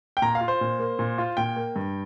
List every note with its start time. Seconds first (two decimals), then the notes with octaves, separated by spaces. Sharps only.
0.17 G5
0.22 A#2 A#5
0.35 F5
0.41 F4
0.48 C5
0.61 A#2
0.79 A#3
0.99 A#2
1.18 F4
1.37 A#2 G5
1.56 A#3
1.76 G2